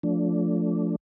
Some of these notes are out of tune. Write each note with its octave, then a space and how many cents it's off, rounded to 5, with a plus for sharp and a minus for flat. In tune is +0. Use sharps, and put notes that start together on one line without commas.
F3 +0 A3 +0 D4 -20